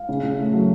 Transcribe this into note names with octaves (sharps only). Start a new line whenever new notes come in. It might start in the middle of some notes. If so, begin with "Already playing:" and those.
Already playing: F5
C#3
C#3
A3
F#3